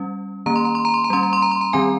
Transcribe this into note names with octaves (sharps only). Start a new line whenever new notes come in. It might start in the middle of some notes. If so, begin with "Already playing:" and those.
Already playing: G3 C#4
D#3 A#3 C#4 A#5
C6
A#5
C6
A#5
C6
A#5
G3 C#4 C6
A#5
C6
A#5
C6
A#5
D#3 G3 C4 G#5